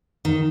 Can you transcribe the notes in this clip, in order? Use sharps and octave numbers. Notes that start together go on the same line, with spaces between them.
D#3